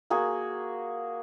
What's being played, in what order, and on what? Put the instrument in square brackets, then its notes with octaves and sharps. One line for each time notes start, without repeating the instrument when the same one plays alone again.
[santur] A#3 F#4 G#4